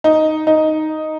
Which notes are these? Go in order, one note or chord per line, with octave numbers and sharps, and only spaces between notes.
D#4
D#4